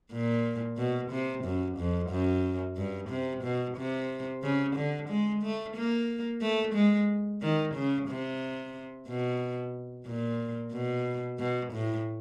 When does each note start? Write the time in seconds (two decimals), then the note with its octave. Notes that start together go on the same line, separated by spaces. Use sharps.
0.12 A#2
0.78 B2
1.11 C3
1.45 F#2
1.78 F2
2.10 F#2
2.77 G2
3.10 C3
3.44 B2
3.77 C3
4.43 C#3
4.76 D3
5.09 G#3
5.43 A3
5.76 A#3
6.41 A3
6.75 G#3
7.42 D#3
7.75 C#3
8.08 C3
9.08 B2
10.06 A#2
10.73 B2
11.39 B2
11.73 A2